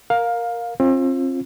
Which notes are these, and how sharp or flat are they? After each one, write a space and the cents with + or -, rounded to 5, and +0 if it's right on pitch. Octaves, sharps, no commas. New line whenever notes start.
A#4 +0 F5 +15
C4 +35 F4 +0